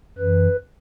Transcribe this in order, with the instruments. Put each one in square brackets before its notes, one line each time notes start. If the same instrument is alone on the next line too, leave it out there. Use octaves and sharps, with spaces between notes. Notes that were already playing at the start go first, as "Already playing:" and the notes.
[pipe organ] F#2 E3 B4